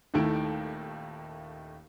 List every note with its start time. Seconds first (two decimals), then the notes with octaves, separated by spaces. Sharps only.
0.14 D#1 D#2 D#3 A3 E4 D7